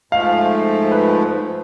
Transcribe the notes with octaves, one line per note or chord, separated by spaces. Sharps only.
G#2 F3 A3 F5
B4